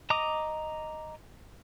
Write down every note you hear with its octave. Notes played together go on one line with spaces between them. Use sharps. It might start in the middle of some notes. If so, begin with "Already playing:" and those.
D#5 A#5 D6 D#6